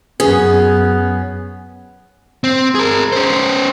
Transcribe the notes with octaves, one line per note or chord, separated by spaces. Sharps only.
F#2 B3 C#4 G#4
C4
G#4 A#4
C#4 C5